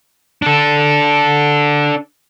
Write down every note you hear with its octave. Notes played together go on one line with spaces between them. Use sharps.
D4 A4